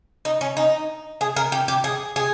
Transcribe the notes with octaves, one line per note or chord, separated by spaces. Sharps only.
D#4
C#4
D#4
G#4
A#4
G4
G4
G#4
G#4